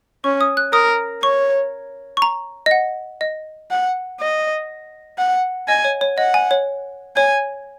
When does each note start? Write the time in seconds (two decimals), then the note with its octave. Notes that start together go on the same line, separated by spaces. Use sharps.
0.24 C#4 C#6
0.41 D#6
0.57 F#6
0.73 A#4 D#6
1.23 C#5 C#6
2.17 C#6
2.22 A#5
2.66 D#5
2.71 F#5
3.21 D#5
3.70 F#5
4.20 D#5
5.18 F#5
5.68 D#5 G#5
5.84 C#5
6.01 C#5
6.18 D#5 F#5
6.34 G#5
6.51 C#5
7.16 C#5 G#5